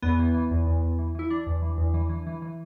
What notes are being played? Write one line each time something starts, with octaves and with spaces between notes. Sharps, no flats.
E2 B3
E3
E3
E2
E2
E2
E3
E3 E4
E3 D4
E2
E3
E2
E3
E3
E3
E3